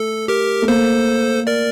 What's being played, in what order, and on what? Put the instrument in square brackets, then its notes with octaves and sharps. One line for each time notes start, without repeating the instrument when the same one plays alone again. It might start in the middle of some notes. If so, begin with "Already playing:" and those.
Already playing: [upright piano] A3 [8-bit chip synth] A4
[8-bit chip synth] G4 A#4
[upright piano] A3
[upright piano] A#3 [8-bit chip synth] A4 C5
[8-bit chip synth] A#4 D5